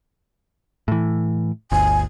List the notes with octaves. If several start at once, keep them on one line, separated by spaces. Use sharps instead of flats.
A2 E3
G1 D2 G#5